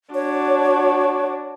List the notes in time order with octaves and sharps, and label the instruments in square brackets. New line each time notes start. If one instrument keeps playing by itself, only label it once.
[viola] D4 F#4 [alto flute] C#5